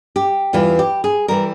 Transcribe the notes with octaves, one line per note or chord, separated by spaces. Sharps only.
G4
E2 E3 G3 F4
G4
G#4
E3 G3 A#4